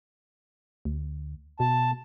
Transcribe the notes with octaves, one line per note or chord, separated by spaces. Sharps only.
D2
B2 A5